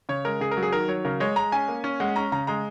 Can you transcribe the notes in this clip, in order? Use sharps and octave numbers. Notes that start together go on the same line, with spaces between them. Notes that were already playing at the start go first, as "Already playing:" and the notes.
C#3 C#5
G#3 A#4
C#3 G#4
A#4
F#3
G#4
D#3 A#4
F#3 C#5
C#3 A#4
G#3 C#5
G#3 A#5
C#4 G#5
A#3
C#4
G#3 F#5
C#4 A#5
C#3 A#5
G#3 A#5